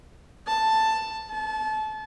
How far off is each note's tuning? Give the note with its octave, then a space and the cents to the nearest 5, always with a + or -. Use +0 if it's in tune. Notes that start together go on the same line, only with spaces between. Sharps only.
A5 +5
A5 -30